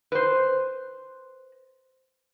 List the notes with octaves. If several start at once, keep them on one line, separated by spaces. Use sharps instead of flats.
B4 C5